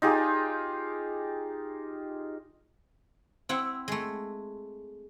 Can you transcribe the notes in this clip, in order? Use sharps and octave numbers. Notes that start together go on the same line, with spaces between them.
D#4 F4 G4 G#4
C4 E4 F#5
G#3 A3